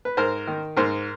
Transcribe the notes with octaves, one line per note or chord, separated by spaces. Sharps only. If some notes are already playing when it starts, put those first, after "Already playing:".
B4
G#2 A#4 C5
D#3
G#2 A#4 C5